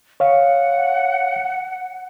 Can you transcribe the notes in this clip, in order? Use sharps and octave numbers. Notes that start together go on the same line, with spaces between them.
C#5 F5 F#5